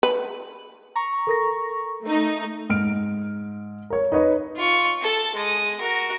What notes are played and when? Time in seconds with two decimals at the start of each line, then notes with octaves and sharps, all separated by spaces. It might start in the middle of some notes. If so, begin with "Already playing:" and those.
0.03 B4
0.96 A#5 C#6
1.27 A4 A#4 A#6
2.03 A3 D#4
2.70 G#2 F6 D7
3.90 A#4 C#5
4.12 D#4 B4 C#5 D#5
4.57 F4 C#6
5.02 A4 A5
5.35 G#3 D#6
5.80 F#4 A#4